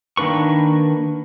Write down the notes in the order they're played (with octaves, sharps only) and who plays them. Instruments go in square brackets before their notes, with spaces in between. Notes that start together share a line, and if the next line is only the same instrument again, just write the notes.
[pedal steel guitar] D#3 A#3 D4 B4 C#6